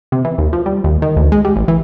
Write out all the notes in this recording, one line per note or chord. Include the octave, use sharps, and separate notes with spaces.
C3
E3
D#2
F3
G3
D#2
D#3
D2
G#3
G3
A1
E3